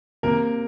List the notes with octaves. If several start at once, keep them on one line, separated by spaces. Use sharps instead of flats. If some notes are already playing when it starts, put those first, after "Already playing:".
C3 A#3 A#4